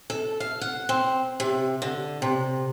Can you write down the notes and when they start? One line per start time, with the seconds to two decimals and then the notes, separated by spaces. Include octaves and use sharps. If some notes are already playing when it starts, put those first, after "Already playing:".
0.10 A4
0.40 F5
0.61 F#5
0.89 C4
1.40 C3
1.82 D3
2.22 C3